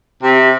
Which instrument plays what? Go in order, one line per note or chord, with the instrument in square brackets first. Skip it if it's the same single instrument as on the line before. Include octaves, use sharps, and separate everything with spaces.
[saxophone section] C3